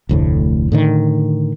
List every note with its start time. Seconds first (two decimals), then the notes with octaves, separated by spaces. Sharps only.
0.09 F1 D2 A2
0.72 A2 D3 D#3